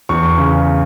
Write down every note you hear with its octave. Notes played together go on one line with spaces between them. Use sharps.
E2 C#6
C#3